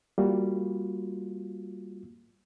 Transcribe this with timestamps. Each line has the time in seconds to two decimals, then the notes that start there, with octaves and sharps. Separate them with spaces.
0.18 G3 A#3 F4 F#4